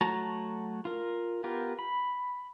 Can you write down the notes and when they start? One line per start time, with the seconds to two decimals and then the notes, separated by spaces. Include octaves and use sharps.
0.01 F#3 A3 F#4 A5 A#5
0.85 F4 A#4
1.44 B3 F4 G4 A#4
1.79 B5